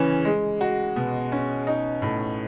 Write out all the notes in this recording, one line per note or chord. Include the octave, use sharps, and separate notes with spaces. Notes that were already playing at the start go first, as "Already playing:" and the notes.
Already playing: C#3 E3 C#4
G#3
F#4
B2
C#4
D#4
A2